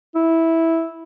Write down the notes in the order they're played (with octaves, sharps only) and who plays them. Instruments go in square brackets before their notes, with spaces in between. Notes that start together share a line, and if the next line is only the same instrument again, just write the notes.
[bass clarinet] E4